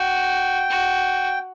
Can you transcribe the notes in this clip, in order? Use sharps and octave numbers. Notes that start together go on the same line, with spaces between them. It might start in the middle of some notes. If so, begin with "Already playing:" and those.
Already playing: F#4 G5
F#4